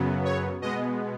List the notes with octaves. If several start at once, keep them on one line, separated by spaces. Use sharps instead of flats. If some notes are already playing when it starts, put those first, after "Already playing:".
Already playing: F#2 C#3 F#3 B3
C#5
B2 G#3 B3 D#5